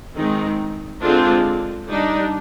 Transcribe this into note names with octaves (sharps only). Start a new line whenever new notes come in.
D#3 G#3 C4 D#4
D3 G#3 C4 D4 F4
G3 D4 D#4